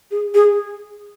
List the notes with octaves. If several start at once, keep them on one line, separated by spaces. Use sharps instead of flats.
G#4
G#4